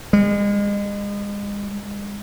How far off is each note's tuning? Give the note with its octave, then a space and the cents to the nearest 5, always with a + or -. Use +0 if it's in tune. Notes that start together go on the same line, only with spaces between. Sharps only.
G#3 -35